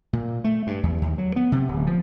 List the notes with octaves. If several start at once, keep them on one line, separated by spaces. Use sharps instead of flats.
A#2
A3
G2
E2
D#2
F#3
B3
C3
D1
F3